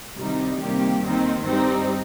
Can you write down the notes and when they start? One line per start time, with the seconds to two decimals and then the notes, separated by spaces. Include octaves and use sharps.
0.17 C2 C3 D#3 G3 D#4
0.60 C3 D#3 G3 A#3 G4
1.03 D#2 D#3 C4 D#4
1.46 G2 G3 C4 D#4